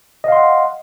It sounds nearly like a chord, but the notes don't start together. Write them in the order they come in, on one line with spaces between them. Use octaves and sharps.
D#5 F5 C6 F#5